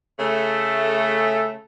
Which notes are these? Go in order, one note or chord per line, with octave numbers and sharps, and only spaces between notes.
C#3 A3